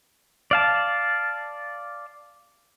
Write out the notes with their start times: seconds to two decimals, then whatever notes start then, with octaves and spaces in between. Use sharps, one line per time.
0.51 D5 F5 A5